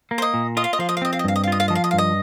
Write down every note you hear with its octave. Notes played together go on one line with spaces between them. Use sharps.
A#3
C5
D#5
A#2
F4 D#5
F5
D#5
F3 F5
D#5
F5
C4 D#5
F5
D#5
G2 F5
D#5
F5
F4 D#5
F5
F3 D#5
F5
D#5
G2 F5
D#5